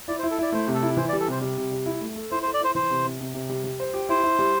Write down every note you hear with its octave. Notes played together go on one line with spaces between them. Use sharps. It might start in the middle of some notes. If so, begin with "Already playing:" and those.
E4 D5
C5
E4
A4
E4 D5
A3 C5
C3
A4
E4
E3 C5
D5
G3
A4
C3 C5
G3
C3
G3
E4
A3
A4
E4 C5
C5
A4
D5
E4 C5
E3 C5
C3
C3
C3
C3
G3
G3
C5
G4
E4 C5
E4
G3